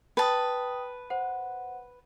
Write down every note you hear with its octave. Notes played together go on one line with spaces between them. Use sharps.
B4 G5 A5 D#6
C5 F#5